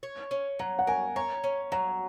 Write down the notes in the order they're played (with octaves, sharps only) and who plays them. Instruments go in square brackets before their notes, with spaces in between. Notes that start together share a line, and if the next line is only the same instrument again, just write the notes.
[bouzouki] C#5
C#4
[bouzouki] F#3 [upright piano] A#5
[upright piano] F#5
[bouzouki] A#4 [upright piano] G#5
[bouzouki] C#5 [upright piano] A#5
[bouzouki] C#4
[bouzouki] F#3 [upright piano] A#5